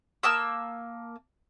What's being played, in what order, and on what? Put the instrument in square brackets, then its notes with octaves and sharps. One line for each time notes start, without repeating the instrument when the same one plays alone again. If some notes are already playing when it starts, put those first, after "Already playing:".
[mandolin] A#3 A5 D#6 E6